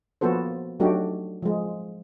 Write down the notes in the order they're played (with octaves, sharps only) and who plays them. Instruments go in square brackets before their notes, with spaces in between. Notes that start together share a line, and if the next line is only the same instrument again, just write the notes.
[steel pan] F3 A#3 B3 F#4 A4 C5
F#3 A3 D4 D#4 F#4 G4
F3 G#3